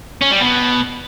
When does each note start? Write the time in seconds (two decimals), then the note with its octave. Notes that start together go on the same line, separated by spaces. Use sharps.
0.22 C#4
0.31 G3
0.41 B2